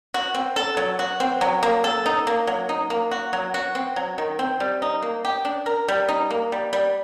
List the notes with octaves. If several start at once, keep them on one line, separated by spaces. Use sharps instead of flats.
F#4
C4
A4
F#3
F#4
C4
F#3
A#3
A4
D#4
A#3
F#3
D#4
A#3
F#4
F#3
F#4
C4
F#3
D#3
C4
G3
D#4
A#3
G4
D4
A#4
G3
D#4
A#3
G3
G3